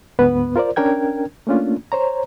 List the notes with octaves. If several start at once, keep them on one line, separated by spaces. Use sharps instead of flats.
D2 G#2 B3 B4
F4 A#4 C5 D5
C#4 D4 A#4 G5 G#6
A3 A#3 C#4 D4 F4
C5 C#5 A#5